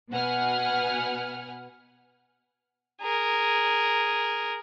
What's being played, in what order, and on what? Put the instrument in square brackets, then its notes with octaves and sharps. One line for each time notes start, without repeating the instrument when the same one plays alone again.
[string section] B2 B4 F#5 G#5 F6
[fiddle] G#4 A#4